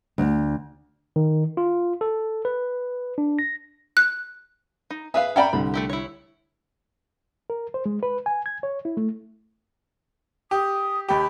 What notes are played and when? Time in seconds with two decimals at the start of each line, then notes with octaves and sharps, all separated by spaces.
0.18 D2
1.16 D#3
1.57 F4
2.01 A4
2.45 B4
3.18 D4
3.39 A#6
3.97 F#6
4.90 D#4
5.14 G#4 B4 E5 F5
5.36 C#4 D5 E5 G5 A#5 B5
5.53 C2 D3 B5
5.74 A3 E4 G4
5.90 E4 C#5
7.50 A#4
7.74 C5
7.86 G#3
8.03 B4
8.26 G#5
8.46 G#6
8.63 C#5
8.85 E4
8.97 A3
10.51 G4 D#6
11.09 D#2 G4 B5